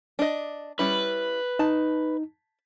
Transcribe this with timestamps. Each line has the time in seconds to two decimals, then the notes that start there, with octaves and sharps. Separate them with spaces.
0.19 D4 D#5
0.79 G3 C#4 E4 B4
1.59 D#4 A5